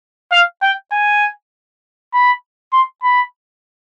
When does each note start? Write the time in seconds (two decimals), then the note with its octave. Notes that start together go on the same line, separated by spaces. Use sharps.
0.32 F5
0.62 G5
0.92 G#5
2.14 B5
2.73 C6
3.03 B5